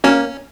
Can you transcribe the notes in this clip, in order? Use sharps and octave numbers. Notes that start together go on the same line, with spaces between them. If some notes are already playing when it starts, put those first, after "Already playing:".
A#3 C#4